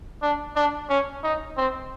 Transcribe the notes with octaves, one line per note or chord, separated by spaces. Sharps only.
D4
D4
C#4
D#4
C4